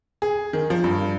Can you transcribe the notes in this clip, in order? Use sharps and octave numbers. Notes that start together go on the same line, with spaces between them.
G#4
D#3
F3
G2